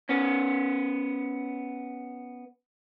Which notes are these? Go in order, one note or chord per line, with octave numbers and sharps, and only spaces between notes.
B3 C#4